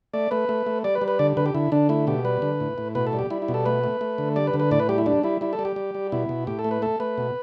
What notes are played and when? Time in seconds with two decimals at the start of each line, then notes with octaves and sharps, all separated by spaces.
0.14 A3 D5
0.31 A3 B4
0.49 A3
0.67 A3
0.84 G3 D5
0.95 B4
1.02 G3
1.08 B4
1.19 D3 D5
1.37 D3 B4
1.46 G4
1.55 D3 E4
1.72 D3 D4
1.89 A3 E4
2.07 B2 G4
2.25 G3 B4
2.42 D3
2.60 A2
2.78 A2
2.95 B2 B4
3.07 A4
3.13 G3
3.19 G4
3.30 G3 E4
3.42 E4
3.48 B2
3.54 A4
3.65 A3 B4
3.84 A3
4.01 A3
4.18 D3
4.36 G3 D5
4.47 B4
4.54 D3
4.60 B4
4.71 A2 D5
4.80 B4
4.89 G3 G4
4.98 E4
5.06 G3 D4
5.23 G3 E4
5.41 G3 E4
5.53 A4
5.59 G3
5.65 G4
5.76 G3
5.95 G3
6.12 B2 E4
6.29 B2
6.47 A2 G4
6.59 A4
6.64 A3
6.71 B4
6.82 A3 A4
7.00 A3 B4
7.18 B2